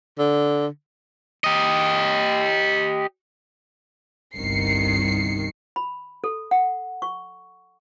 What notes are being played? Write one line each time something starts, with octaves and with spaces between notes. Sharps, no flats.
D3
G4 D#5
G1 C2 G2 D#3 C7 C#7
B5
A4
F#5
C#6